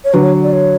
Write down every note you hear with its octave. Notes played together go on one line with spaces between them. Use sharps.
C#5
D3 F#3 B4
C#5
D5
C#5